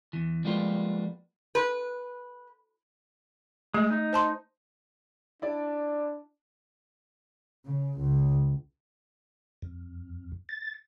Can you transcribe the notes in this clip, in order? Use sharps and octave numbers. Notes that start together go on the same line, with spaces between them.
E2 E3
F3 G3 G#3 A#3 B3 F4
B4
G#3 A3
D#4
C5 A5 C6
D4 E4 D5
C#3
C#2
F2
A6